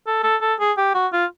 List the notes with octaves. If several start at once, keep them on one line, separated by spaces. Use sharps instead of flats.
A4
A4
A4
G#4
G4
F#4
F4